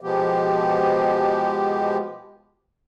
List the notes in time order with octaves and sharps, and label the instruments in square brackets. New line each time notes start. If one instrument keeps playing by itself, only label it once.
[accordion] B2 F3 G#3 B3 G4